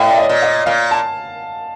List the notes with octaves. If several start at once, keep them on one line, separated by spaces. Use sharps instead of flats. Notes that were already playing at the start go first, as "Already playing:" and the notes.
Already playing: A2 D#5 F5
D5
D#5
A#2
D#5
A#2 F5
A5